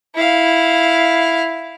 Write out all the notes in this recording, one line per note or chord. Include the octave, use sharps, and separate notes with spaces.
E4 F5